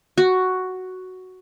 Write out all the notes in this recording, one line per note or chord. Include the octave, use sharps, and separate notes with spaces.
F#4